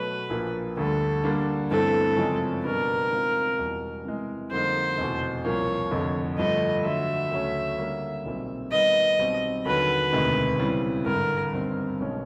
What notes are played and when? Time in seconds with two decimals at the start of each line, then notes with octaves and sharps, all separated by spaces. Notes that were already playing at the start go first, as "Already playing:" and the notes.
Already playing: B2 F#3 A3 B4
0.30 A#1 A#2 F3 A#3
0.77 D2 D3 G3 A4
1.24 D3 G3 A#3 D4
1.70 G1 G2 E3 A3 C4 A4
2.17 F#2 C#3 F3 G#3 C4
2.64 B2 G3 B3 D4 A#4
3.11 D#3 G#3 C4 F4
3.58 E1 E2 B2 G3
4.04 C3 E3 G#3
4.51 F2 D3 G3 A#3 D#4 C5
4.97 F1 E2 B2
5.45 C2 A#2 F3 A#3 C#5
5.91 F1 F2 D3
6.38 G2 D3 F3 A3 D#5
6.85 D3 F#3 A3 E5
7.31 D2 C#3 F#3 A3 C#4
7.78 D3 G3 A#3 C#4
8.25 B1 A#2 G3 C4
8.71 D#3 G3 B3 D#5
9.19 B1 B2 G3 C4
9.65 D#2 D3 F#3 B4
10.13 E1 D2 C3 D#3 G#3
10.58 C#3 E3 G3 C4
11.05 G#1 G2 D3 A#4
11.52 G1 G2 D#3 G3 C4
12.00 B1 B2 G#3 C#4